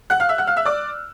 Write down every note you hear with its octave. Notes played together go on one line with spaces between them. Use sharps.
F#5 F#6
F5 F6
E5 E6
F#5 F#6
F5 F6
E5 E6
D5 D6